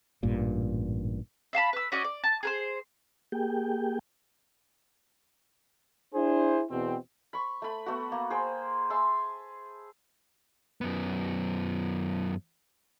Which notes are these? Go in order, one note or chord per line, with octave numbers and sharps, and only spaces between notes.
A1 G2 A#2
E5 F5 A5 B5
B4 E6
C#4 F#4 D5 D#5
D5
A5
G#4 A#4 C5
A#3 G4 G#4 G5
D4 E4 G#4 C5
E2 B2 C4
B5 C#6
A3 B5
A3 B3 F#4
A#3
G#4 C5 G5
G#4 E5 A5 C6
F#2 B3